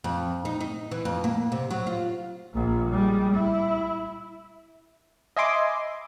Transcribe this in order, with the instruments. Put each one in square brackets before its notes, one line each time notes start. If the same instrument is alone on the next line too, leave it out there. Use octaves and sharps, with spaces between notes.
[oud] F2
D#4
D#4
E3
F2
A#3
C3
F#3
F4
[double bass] A#1 A#2
G3 G#3
E4
[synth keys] D#5 E5 G#5 B5 C6 D6